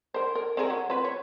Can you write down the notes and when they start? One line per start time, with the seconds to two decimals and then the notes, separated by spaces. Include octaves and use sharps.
0.14 A#4 C5
0.35 A#4
0.57 C4 G#4 A#4
0.70 F#3
0.90 C4 F4 B4
1.05 C#5